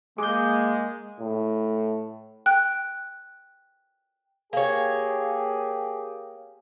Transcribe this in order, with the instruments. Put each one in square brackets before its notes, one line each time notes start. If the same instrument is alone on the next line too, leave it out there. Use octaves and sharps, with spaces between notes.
[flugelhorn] G#3 [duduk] A#3 [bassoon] G#4 [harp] D6 G6
[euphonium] A2
[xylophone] G5 F#6
[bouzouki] A#3 C#5 [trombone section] G4 G#4